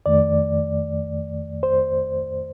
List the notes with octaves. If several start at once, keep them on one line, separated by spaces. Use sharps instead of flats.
F2 D#3 A3 D5
C5